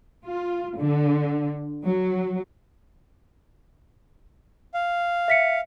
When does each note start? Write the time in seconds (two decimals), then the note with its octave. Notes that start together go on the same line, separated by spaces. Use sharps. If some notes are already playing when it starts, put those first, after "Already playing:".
0.24 F4
0.78 D3
1.84 F#3
4.74 F5
5.28 E5 B6 C#7